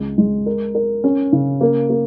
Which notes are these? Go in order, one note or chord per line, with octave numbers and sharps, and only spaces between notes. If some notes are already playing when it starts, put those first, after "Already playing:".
Already playing: C#2 G#3
G#3
A#4
A#4
C#4
C#3
A#3
A#3